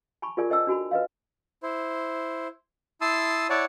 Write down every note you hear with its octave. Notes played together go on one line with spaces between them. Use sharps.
G#5 A5 B5 C#6
F4 G#4 A#4 D5 G#5
A4 C5 D#5 G5 A5 E6
D4 F#4 G#5 B5
B4 D#5 F5
E4 C5
E4 A5 C6 D#6 E6
E4 C#5 D5 F#5 A5